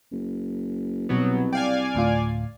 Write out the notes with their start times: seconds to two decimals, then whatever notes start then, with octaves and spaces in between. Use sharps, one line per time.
0.12 F#1
1.09 C2 B2 F#3 B3
1.53 D5 F5 G5 G#5
1.95 D2 A2 F4